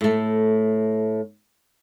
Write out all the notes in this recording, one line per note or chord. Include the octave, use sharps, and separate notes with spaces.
A2 A3